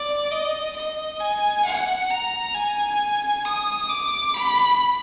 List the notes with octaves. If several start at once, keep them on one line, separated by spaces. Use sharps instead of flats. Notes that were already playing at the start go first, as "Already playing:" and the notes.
Already playing: D5
D#5
D#5
G#5
F#5
A#5
G#5
D#6
D6
B5